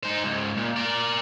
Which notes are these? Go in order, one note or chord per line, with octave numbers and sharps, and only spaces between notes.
D#4 C5
C#2 G#2
A#2
A#4 D5